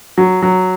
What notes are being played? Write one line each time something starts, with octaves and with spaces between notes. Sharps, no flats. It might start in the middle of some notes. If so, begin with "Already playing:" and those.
F#3
F#3